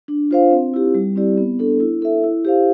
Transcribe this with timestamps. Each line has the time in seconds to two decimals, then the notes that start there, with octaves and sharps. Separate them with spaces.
0.08 D4
0.31 F4 C5 F5
0.51 C4
0.74 E4 G4
0.94 G3
1.16 C4 E4 G4 D5
1.37 B3
1.59 D4 A4
1.80 E4
2.02 A4 E5
2.24 E4
2.45 G4 C5 F5